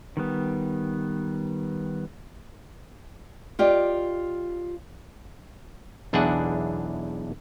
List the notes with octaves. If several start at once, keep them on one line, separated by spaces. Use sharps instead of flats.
D#3 G3 B3
F4 G4 D5 D#5
B1 E2 D4 E4 G#4 F#5